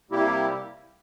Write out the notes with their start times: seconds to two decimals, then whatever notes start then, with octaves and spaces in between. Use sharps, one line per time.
0.10 C3 G3 A#3 E4 G4